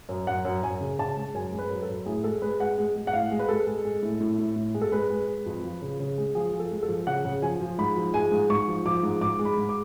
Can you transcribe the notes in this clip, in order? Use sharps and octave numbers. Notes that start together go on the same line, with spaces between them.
F#2
F#2 F#5
F#2
F#2 G#5
C#3
C#3 A5
G#3
F#2 G#5
G#3
B4
F#2
A4
F#2
A2 G#4
G#3 A4
G#3 B4
G#3 F#5
G#3
G#3
F#5
A2 F5
G#3
B4
G#3 A4
G#3
G#3
A2
A2
A2
A2
G#3
A4
G#3 B4
G#3
G#3
F2
F3
C#3
C#3
G#3
F3 G#4
F3
A4
G#3
A4
F3
C#3 F#5
C#3
F3 G#5
F3
G#2 B5
F3
G#3 G#5
G#2
G#2 C#6
F3
F3 D6
G#2
G#2 D6
G#3
B5
G#2
D6